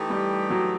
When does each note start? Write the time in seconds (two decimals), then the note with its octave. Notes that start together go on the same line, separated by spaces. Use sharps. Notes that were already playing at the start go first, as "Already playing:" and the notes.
Already playing: E3 A3 D#4 G4
0.10 G3
0.50 F#3